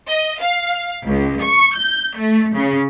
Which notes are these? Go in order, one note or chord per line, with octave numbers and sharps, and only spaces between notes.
D#5
F5
C#2
C#6
G6
A3
C#3